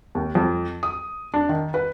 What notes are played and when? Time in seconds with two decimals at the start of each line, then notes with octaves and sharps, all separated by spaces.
0.15 D#2
0.35 F2
0.83 D#6
1.34 D4
1.49 D#3
1.74 B4